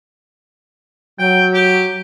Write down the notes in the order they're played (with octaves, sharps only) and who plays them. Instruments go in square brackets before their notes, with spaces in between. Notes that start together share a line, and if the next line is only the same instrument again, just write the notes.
[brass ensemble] F#3 [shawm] G5
[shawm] G4